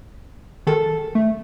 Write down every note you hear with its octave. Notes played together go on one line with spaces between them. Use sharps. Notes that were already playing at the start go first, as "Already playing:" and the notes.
D#3 A4
A3